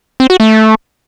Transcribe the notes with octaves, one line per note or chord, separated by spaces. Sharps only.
C4
F#4
A3